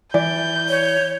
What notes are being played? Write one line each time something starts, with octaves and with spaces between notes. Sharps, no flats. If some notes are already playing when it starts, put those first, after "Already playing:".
E3 D5 G6
C#5